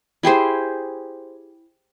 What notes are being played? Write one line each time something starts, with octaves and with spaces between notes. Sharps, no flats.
E4 G4 G#4 C5